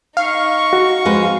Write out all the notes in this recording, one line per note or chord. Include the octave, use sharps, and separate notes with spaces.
D#4 F5 C#6
F#4
F2 G#3 B4